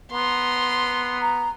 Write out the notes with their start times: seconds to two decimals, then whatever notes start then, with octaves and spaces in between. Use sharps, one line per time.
0.12 B3 A#5 C6
1.22 A#5